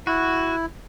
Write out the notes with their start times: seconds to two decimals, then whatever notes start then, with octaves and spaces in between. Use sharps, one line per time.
0.07 E4 F#4